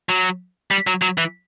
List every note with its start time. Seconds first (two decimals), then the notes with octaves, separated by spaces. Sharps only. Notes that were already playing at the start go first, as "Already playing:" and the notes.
0.09 F#3
0.71 G3
0.87 F#3
1.02 F#3
1.18 E3